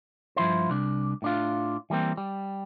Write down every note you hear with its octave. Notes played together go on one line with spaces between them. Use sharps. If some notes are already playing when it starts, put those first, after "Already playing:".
G2 F3 E4 C5
C2 D4
A2 D4 F4
E3 G3 A#3 C4
G3